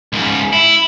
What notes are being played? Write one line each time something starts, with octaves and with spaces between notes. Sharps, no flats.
C#2 G#2
E4